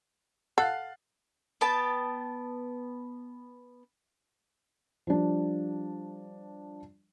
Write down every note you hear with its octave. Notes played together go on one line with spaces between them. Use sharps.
A4 F5 F#5 F#6 A6
B3 G5 A5
F3 G3 D4